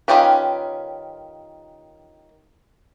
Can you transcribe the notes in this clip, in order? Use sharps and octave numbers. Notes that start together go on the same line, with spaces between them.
D#3 C#4 F4 G4 B4